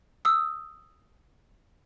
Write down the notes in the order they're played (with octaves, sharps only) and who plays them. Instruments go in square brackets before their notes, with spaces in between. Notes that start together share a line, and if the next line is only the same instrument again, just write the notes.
[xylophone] D#6 E6